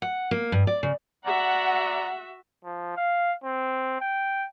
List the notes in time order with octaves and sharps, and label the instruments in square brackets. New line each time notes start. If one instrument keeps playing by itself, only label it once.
[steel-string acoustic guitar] F#5
A#3
G2
D5
C#3
[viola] F#4 E5 [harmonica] D5 A#5 [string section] F#5
[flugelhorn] F3
F5
C4
G5